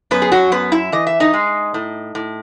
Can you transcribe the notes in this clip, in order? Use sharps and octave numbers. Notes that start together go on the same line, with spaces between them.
F#2 B3 B4
G#4
F#3 F#4
F#2 B3 B4
E4 E5
E3 D#5
E5
D#4 D#5
G#3
A2
A2